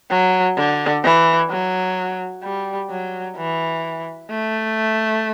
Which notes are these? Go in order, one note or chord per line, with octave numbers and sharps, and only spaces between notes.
F#3
D3
E3
F#3
G3
F#3
E3
A3